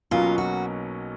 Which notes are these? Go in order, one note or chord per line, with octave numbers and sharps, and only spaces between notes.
B1 B2 F#3 A#3 C#4 F4
F#4